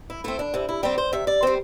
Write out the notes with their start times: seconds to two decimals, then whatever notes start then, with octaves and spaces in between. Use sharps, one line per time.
0.10 E4
0.24 A3 C4 E4
0.39 D4
0.54 C3 E4
0.69 E4
0.83 G3 C4 G4
0.98 C5
1.13 C3 E5
1.27 D5
1.43 G3 C4 C5